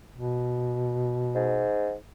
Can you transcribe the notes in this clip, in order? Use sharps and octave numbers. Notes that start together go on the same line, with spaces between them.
B2
G#2